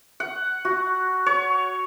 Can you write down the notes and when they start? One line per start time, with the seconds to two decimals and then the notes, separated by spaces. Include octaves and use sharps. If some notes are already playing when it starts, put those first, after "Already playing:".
0.20 F#5
0.65 F#4
1.26 C#5